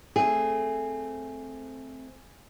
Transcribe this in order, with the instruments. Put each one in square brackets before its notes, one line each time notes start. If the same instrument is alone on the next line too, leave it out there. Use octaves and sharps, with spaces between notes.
[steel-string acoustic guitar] A3 C4 [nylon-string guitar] G#4